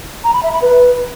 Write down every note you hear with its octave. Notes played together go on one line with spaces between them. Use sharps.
A#5
B5
E5
B5
B4